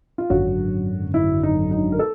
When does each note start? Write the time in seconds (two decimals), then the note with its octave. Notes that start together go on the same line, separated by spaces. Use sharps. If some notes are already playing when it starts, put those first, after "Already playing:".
0.18 F4
0.30 G#1 F#2 D3 F#3 F#4
1.14 E4
1.43 D#4
1.71 D#4
1.92 A#4
1.99 A4